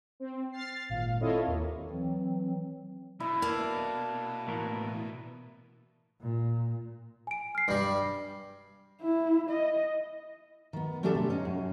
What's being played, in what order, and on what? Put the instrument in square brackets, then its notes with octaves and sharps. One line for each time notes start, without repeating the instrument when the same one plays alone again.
[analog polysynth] C4
F6 A6 C7
G#1 A#2 F5
C4 E4 F4 A4 C#5 D#5
D#2 A#3
[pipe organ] E3 F#3 C4
[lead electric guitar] B2 [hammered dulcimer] E4
[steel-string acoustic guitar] A#3 D4
[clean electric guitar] A2 E3 A#4
[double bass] A#2
[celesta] G#5 D7
F6 C7
[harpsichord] G2 G3
[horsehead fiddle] E4
D#5
[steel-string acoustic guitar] D#3 B3
A3 B3 C#4 D4 G4 A4
C3
C#4 D#4
F#2